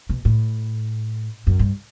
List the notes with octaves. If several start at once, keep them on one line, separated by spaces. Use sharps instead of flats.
B2
A2
F#2
G2